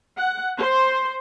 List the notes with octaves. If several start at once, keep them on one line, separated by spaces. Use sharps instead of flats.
F#5
C5